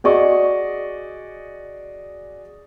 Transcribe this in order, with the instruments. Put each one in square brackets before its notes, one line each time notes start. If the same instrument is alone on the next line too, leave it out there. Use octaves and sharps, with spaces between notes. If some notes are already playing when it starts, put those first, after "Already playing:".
[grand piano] F#4 G#4 D5 D#5 C#6